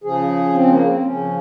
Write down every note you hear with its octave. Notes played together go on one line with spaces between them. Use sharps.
C#3 F3 G#4
C4
A#3
C4
C#3 F3 C#4